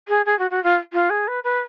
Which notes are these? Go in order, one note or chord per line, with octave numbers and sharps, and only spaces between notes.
G#4
G#4
F#4
F#4
F4
F4
G#4
B4
B4